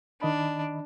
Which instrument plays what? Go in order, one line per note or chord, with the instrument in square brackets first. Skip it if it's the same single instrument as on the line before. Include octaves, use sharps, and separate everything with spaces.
[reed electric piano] D#3 D#5 B5 [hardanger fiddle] D4